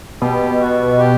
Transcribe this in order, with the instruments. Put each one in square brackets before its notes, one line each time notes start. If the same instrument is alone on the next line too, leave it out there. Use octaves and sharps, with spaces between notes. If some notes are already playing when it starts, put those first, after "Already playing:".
[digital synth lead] B2 [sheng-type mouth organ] G4
[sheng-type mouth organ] F#4
G4